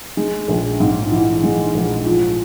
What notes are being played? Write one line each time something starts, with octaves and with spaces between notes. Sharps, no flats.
G#3
A#1
G#2
E3
G#3
A#1
F3